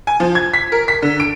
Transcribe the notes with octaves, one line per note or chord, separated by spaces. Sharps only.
G#5
F3
G#6
B6
A#4
B6
D3
D7